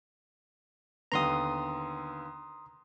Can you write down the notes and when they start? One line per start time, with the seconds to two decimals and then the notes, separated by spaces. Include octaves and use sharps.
1.12 D#2 D3 B3 A#5 C6 D#6